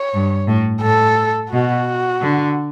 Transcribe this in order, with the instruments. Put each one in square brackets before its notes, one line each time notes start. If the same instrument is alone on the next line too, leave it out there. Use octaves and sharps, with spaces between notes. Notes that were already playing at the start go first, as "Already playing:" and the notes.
Already playing: [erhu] C#5
[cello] G2
A2
[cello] A2 [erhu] A4
[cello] B2 [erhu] F#4
[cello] D3